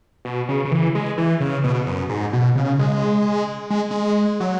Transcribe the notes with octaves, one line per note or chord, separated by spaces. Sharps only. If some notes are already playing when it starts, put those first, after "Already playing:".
B2
C#3
C#3
E3
G#3
E3
C#3
B2
F#2
G#2
B2
C#3
G#3
G#3
G#3
F#3